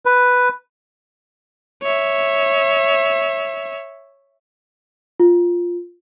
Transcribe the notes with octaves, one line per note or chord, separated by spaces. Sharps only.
B4
C#5 E5
F4